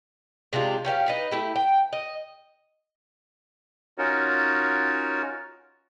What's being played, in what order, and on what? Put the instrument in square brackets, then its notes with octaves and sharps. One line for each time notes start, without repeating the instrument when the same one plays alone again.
[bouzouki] C3 G#3 D4 F4
C#4 G4 C5 F5
D#4 B4 D#5
A3 E4 G4
G5
D#5
[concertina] C#4 D#4 F4 F#4 A#4 C#5